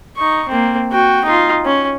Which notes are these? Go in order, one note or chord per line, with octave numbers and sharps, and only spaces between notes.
D#4 C#6
A#3 C4
F#4 G5
D#4 F4
C#4